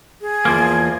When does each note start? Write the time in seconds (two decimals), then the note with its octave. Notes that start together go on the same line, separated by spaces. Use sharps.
0.21 G#4
0.45 E2 F3 A#3